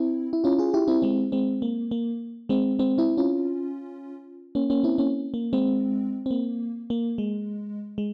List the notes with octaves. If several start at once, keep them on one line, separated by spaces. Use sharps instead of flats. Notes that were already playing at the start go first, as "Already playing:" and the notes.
Already playing: C4 E4
E4
C#4 F4
F4 G#4
E4 G4
C4 E4
G#3 C4
G#3 C4
A#3
A#3
G#3 C4
G#3 C4
C4 E4
C#4 F4
A#3 C#4
A#3 C#4
C4 E4
A#3 C#4
A#3
G#3 C4
C4
A#3
A#3
G#3
G#3